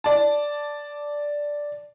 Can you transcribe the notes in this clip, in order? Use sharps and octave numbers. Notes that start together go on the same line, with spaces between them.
D5 A5